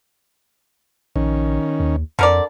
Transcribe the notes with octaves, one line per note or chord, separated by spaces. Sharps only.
A#1 D#3 C#4
D#2
F2 D3 A#4 D5